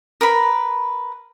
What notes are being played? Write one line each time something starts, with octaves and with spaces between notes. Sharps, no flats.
A#4 B4 B5